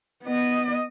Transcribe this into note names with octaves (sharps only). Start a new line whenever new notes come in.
B3 D#5